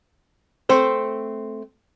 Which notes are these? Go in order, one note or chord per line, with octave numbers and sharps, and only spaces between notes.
A3 C4 C5